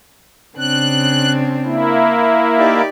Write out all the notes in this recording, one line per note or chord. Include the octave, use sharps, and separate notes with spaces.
C#3 C4 D4 F#6
A#3 E4
D#4 G4 D5